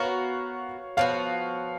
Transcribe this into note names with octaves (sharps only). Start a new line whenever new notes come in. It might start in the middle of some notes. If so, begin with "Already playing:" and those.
Already playing: B3 F#4 A#4 C#5 F5
F3 B3 F#4 C#5 F5